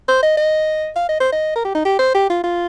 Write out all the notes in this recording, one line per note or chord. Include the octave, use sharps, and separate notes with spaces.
C5
D#5
D#5
F5
D#5
C5
D#5
A#4
G4
D#4
G4
C5
G4
F4
F4